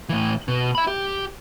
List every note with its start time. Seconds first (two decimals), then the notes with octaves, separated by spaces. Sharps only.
0.09 A2 E3
0.48 B2
0.75 E5 B5
0.87 G4